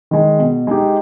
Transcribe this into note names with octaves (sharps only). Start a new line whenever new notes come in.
D#3 G#3
B2
G#3 D#4 G4